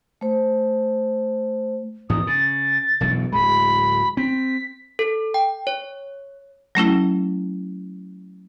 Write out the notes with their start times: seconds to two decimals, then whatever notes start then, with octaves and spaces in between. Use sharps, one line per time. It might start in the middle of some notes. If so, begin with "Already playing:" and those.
0.21 A3 C5
2.09 G#1 E2 G#2 D#6
2.27 C#3 A6
3.00 E1 B1 F#2
3.32 D1 G#3 B5
4.17 C4 B6
4.99 A4
5.34 G5
5.67 C#5
6.75 F#3 A3 C#4 E4